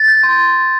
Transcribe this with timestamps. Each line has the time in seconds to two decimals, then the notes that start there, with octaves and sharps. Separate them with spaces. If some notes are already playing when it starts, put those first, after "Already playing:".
Already playing: A6
0.08 G6
0.23 C6